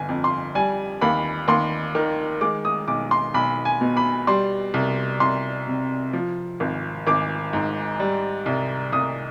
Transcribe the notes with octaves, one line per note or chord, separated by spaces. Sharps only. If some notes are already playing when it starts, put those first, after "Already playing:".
Already playing: G1 G#5
F2
C6
G3 G#5
D#2 B5
D#2 C6
D#3
G#3 D6
D#6
B1 D6
C6
B1 B5
G#5
B2
B5
G3 C6
C2
C2 C6
C3
F3
G#1
G#1 D6
G#2
G3
C2
C2 D#6